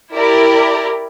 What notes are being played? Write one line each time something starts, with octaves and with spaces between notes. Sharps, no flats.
E4 G4 A#4 D5